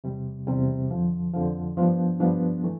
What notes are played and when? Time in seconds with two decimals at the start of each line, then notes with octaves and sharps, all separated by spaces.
0.04 E2 C3 G3
0.47 E2 C3 G3
0.90 F2 D3 F3
1.34 F2 D3 F3
1.77 G2 F3 B3 D4
2.20 G2 F3 B3 D4
2.64 E3 A3